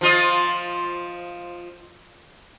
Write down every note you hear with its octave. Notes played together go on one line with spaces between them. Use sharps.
F3 F4 D#5